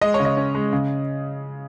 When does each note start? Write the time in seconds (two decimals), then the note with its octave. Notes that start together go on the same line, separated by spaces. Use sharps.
0.01 G#3 D#5
0.14 C#5
0.20 C#3
0.25 D#5
0.37 C#4
0.55 G#3
0.73 C#3